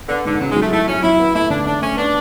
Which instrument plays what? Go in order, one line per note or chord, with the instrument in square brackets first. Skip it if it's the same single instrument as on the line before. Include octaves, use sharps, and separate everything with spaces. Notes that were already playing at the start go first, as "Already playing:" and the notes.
[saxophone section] D3 [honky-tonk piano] B3
[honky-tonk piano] G#2 [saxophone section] D3
[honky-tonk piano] C#3 [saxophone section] F#3
[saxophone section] G#3
[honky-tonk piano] F#3
[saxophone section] A3
[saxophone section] A3 [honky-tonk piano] E4
[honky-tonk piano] F#3 [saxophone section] C#4
[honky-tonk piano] F#3 [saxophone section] E4
[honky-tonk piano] B3
[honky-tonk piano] A3 [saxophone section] E4
[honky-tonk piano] D3 [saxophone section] D4
[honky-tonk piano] A3 [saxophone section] D4
[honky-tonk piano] A3 [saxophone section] C#4
[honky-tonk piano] B3 [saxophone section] D4